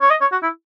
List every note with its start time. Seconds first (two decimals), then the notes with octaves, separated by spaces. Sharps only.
0.02 C#5
0.10 D#5
0.21 C#5
0.32 F#4
0.43 E4